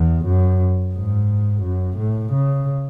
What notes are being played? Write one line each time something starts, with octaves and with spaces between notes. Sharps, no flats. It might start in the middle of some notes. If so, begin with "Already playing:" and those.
Already playing: E2
F#2
G#2
F#2
A2
C#3